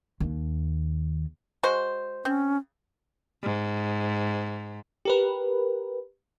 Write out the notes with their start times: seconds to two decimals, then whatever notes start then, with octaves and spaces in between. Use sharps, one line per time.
0.20 D#2
1.63 G#3 F#4 C5
2.25 C4 C#4
3.43 G#2
5.05 G4 A#4 B4